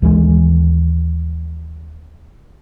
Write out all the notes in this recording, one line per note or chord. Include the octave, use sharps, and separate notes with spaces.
D#2 E3 G3 G#3